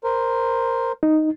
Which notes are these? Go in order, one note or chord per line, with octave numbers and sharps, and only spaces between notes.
A#4 C5
D#4